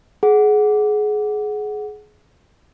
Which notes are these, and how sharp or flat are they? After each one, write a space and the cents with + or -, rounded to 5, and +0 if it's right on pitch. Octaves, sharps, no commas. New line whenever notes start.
G#4 +25 F#5 +0